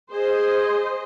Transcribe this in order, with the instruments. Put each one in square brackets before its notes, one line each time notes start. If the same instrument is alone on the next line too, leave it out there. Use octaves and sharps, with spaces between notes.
[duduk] G#4 [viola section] C5 D#5